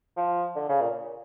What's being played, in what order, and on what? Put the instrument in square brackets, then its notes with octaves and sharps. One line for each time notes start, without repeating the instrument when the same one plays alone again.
[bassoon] F3
D3
C#3
A#2